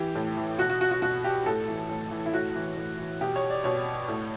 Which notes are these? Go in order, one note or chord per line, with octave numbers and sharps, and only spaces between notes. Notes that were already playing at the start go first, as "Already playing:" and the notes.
Already playing: E3 G4
A2
E3
B2 F#4
F#4
F#4
F#4
B2 F#4
G4
A2 A4
E3
A2
E3
E4
A2 F#4
E3
A2
E3
B2 G4
C#5
D5
B2 C#5
A2